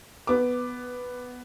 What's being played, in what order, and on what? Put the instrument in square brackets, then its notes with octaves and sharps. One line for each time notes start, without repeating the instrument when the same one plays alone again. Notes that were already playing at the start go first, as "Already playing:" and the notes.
[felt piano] B3 D6